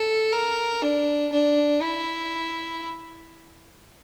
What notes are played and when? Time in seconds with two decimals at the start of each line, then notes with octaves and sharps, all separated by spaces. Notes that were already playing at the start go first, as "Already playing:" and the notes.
Already playing: A4
0.33 A#4
0.82 D4
1.32 D4
1.82 E4